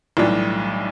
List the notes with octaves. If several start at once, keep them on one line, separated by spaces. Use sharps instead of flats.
B1 A2 E3 G3 D4